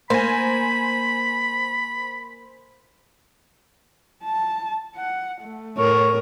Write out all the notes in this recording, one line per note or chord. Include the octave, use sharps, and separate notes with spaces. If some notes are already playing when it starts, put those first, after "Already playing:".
A#3 C5 G#5 B5
A5
F#5
A3
A2 A#4 C#5